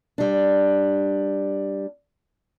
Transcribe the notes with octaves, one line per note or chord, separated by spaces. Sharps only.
G3 D4